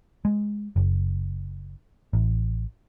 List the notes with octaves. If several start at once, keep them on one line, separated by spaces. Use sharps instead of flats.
G#3
F#1
A1